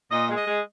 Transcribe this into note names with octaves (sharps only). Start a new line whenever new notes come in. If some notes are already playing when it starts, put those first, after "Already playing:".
A#2 D#5
G#3
D#5
G#3